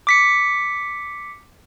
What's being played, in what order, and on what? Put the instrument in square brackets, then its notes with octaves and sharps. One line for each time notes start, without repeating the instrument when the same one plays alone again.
[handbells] D6 B6 C#7